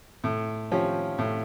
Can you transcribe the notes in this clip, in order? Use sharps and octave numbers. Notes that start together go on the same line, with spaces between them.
A2
F3 C#4 G4
A2